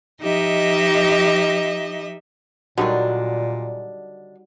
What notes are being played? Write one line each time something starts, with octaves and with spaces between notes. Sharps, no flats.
F3 D#4 G4 D#5 E5
A#2 D3 D#3 F#3 G3 D4 D#4